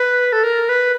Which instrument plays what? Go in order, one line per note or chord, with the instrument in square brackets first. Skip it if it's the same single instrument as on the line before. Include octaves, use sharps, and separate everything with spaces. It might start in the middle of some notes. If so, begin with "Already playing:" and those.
Already playing: [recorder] B4
A4
A#4
B4